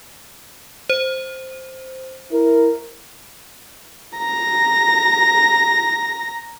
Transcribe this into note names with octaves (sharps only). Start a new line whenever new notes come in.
C5
E4 A#4
A#5 A#6